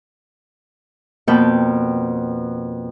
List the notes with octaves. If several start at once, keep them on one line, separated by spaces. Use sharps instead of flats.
F2 B2 A#3 B4 G5 A5